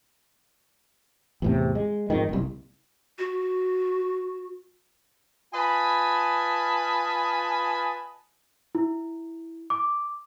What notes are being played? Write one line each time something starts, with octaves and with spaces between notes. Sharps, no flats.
E2 A2 C3
G#3
F2 G#2 D#3
F#1 C2
F#4
F4 B4 D#5 G#5 A5 B5
E4
D6